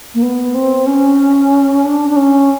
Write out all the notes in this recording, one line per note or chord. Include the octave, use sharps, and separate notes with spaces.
A#3
B3
C4
C#4
D4
D4
C#4